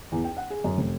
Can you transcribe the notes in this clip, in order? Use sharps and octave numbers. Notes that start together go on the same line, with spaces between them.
E2
G5
F#5
G#4
F#2
F1